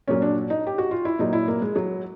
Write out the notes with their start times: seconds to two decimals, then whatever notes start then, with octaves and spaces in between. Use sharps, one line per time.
0.08 A#2 F#3 C#4
0.22 D4
0.50 D#4
0.67 G4
0.78 F#4
0.91 F4
1.05 E4
1.19 A#2 F#3 D#4
1.33 E4
1.48 A#3
1.62 G#3
1.76 F#3